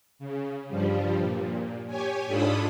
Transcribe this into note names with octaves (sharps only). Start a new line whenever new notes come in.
C#3
G2 F3 G3
A#2
G4 C#5 G#5
G#2 D4 F4 A4 B5 D#6